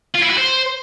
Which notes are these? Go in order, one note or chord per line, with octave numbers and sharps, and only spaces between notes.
F4
E4
F#4
C5